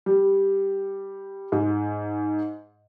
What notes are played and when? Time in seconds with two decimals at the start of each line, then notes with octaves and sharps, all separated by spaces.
0.06 G3
1.52 G#2